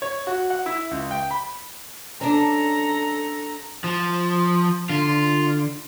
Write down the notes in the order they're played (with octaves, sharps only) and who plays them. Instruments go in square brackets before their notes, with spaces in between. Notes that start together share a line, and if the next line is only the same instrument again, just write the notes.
[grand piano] C#5
F#4
F#5
E4
C#2
G5
B5
[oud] C#4 D4 [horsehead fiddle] A4 A#5
[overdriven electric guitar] F3
[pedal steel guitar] D3 [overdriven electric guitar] F4